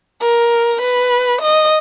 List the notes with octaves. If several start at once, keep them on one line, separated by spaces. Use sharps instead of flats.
A#4
B4
D#5